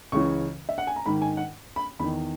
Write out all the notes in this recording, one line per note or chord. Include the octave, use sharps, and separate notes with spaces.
C#2 C#3 E3 C#6
E5
F#5
G#5
A#5
G#2 D#3 B5
G#5
F#5
B5
E2 D#3 B5